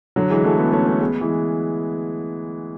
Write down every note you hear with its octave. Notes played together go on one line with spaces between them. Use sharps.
D3 F#3
E3 G#3
F#3 A3
G#3 B3
A3 C#4
A3 C#4
G#3 B3
E3 G#3